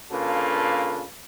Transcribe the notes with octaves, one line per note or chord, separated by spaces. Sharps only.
C#3 A#3 D4 F4 A4 B4